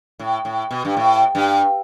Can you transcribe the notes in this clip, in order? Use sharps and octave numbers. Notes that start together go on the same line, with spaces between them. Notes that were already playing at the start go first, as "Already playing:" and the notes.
A2
A2
B2
G2
A2
G2